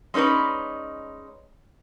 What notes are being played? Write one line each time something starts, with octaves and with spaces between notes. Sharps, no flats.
G#3 C#4 D#4 B4 D5